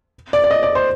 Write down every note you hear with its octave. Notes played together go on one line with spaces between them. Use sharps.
D5
D5
D#5
D5
C5